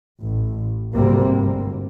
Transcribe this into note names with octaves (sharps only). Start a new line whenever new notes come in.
A1
D2 G#2 C3 G3 A#3 C4
G1